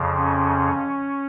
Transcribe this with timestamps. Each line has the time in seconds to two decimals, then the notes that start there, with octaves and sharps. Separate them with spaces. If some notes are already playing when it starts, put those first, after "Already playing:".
Already playing: F2 C#3 F3
0.15 C#4